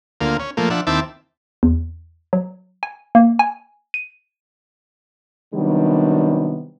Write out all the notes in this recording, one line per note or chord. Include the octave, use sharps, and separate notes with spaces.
D2 A#3 F4
C#4
A#2 F3 A3 A#3
F3 D4 E5 F#5
D#2 C4 E4 E5 A5 D6
E2
F#3
G#5
A#3
G#5
D#7
C3 D#3 F#3 G3 B3 D4